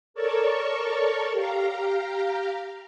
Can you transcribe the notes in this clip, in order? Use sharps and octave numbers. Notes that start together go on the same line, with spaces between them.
A4 A#4 C#5 D5 A5 C#6
G4 F5 A#5